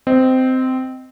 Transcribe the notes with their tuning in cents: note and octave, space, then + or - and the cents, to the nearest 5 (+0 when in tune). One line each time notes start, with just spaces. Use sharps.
C4 -15 D#5 +0